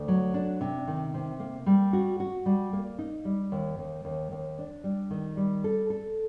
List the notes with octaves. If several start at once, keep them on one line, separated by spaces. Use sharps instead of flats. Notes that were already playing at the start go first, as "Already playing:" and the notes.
Already playing: D2
F#3
D4
C3
D#3
C3
A#3
G3
F#4
F#4
G3
A#3
D#4
G3
D#2
D#2
D#2
D#2
D4
G3
D#3
G3
A4
A4